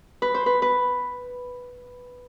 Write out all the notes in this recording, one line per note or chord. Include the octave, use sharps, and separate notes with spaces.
B4
C5
B4
B4